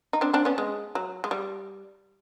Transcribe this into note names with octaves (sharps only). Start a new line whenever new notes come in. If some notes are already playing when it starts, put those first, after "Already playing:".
D#4
C4 D4
C4 D4
B3 C#4
G#3
F#3
G#3
G3